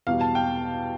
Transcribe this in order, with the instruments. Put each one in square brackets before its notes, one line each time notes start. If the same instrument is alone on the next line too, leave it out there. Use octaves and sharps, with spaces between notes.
[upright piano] E2 B2 G3 F5
A5
G5